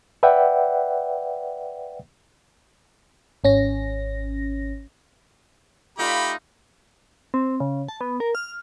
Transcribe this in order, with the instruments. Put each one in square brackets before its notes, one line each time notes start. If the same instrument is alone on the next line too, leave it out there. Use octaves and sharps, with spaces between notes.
[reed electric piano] B4 D5 E5 F#5 G5
[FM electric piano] G#1 C#4 A#6
[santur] A3 F4 D5 [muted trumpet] D#4 [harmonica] G4 B5
[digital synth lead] C4
C#3
A5
B3
A#4
F6